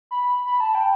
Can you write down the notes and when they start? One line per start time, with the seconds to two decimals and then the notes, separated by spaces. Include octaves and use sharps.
0.11 B5
0.47 B5
0.60 A5
0.75 G5